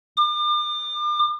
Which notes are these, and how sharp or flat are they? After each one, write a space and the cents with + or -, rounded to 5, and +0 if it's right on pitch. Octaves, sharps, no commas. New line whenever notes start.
D6 +40